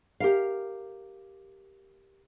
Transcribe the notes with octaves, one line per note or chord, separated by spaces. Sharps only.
G4 A#4 F5